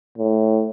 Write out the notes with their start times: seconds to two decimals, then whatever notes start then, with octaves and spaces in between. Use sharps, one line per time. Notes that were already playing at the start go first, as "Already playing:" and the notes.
0.18 A2